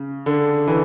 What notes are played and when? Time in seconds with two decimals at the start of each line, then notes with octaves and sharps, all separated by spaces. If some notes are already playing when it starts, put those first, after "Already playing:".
Already playing: C#3
0.26 D3
0.68 E3